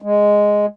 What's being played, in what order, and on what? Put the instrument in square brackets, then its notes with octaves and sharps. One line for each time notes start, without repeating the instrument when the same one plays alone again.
[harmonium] G#3